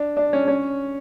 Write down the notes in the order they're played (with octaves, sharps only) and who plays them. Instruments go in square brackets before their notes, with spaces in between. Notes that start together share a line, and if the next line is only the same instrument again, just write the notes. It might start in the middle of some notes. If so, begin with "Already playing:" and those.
Already playing: [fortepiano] D4
D4
C#4
C#4